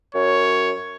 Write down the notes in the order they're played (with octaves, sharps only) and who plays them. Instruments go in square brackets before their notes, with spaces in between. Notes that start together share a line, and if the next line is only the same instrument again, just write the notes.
[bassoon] F#2 [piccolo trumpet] C#5